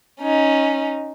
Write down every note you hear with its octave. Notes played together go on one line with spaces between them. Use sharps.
C#4 D#4